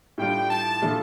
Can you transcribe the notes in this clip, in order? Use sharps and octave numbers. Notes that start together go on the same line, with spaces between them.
A2 G3 D4 F4 G5
A5
A#2 F3 A3 D4